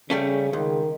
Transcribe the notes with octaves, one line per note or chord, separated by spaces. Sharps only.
C#3 G3 A3 C#4 G#4
C#2 D#3